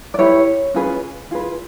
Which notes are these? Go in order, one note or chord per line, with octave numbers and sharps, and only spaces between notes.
D5
E4 G4 B4 C#5
C#4 F4 G#4 B4
F4 G#4 B4